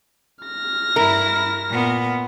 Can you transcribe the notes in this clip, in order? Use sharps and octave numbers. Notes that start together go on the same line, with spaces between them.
F6 A#6
G2 E4 A#4
A#2 B3